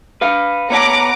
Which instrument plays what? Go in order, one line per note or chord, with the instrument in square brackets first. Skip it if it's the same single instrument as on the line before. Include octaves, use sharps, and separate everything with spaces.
[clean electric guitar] B4 F5
[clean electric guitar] B3 C#5 A5 [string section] F#5 A#5 D6